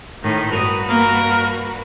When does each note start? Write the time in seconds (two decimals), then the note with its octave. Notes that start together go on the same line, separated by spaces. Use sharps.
0.23 A2 D#3
0.52 G2 F#4 A#4 B4 D#6
0.89 A#3 A#4